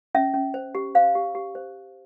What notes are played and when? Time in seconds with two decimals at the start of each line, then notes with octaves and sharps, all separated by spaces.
0.15 C#4 E5
0.34 C#4
0.54 C5
0.75 G4
0.95 C5 F5
1.15 G4
1.35 G4
1.55 C5